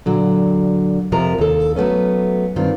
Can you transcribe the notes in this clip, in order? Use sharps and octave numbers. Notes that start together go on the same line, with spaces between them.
A#2 D3 F#3
F2 C3 F3 A#4 A#5
D#2 A4
F#3 A3 B3 C#4
G2 D#3 C4 F4